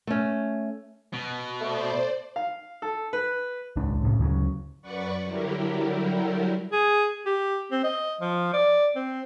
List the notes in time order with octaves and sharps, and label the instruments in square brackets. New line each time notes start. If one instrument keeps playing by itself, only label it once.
[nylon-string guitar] A3 C#4
[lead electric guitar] B2
[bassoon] A3 [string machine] C5 D5
[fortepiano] F5
A4
B4
[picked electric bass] D#1 G#1 C#2 D4
C2 A2 C#3
D2 C#3 E3 F#3
[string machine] F#2 B4 D5 F#5 C#6
D3 F#3 G3 E4 G4 A#4
[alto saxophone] G#4
G4
C4
D#5
F3
D5
C4